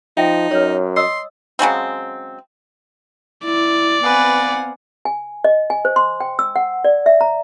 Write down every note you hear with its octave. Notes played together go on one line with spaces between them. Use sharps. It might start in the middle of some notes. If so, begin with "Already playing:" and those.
F3 D#4 E5 G5
F#2 B4 C#5
D#5 C6 D#6 E6
C#3 F#3 G#3 C4
E4 D5
B3 C4 B4 F5 F#5 G#5
G#5
D#5
G#5
C5
C6
G5
E6
F#5
D5
E5
A#5